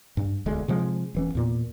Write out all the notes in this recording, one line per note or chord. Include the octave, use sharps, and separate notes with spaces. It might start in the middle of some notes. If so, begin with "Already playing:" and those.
G2
E1 D2 G#3
C3 F3 G#3
E1 E3 C#4
E2 A#2